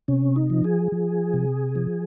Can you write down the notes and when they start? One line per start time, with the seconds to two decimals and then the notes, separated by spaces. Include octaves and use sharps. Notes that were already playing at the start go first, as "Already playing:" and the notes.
0.08 C3 C#4
0.36 D#4
0.50 F3
0.64 G#4
0.92 F3
1.34 C3
1.75 F3